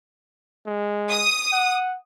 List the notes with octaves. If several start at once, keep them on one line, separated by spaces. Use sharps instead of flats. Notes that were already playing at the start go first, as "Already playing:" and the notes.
G#3
D#6
F#5